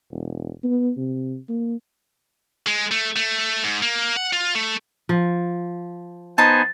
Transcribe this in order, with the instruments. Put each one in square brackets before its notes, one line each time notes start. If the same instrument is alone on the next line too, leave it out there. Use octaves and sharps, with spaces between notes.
[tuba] E1
B3
C3
A#3
[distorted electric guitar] G#3
A3
A3
G#2
A#3
F#5
F4
A3
[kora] F3
[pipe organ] B3 C5 G#5 [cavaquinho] D#4 A5 [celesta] A6